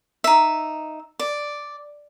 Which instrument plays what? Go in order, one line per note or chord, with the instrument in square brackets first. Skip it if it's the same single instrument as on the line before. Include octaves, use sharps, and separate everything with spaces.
[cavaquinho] D#4 E5
D5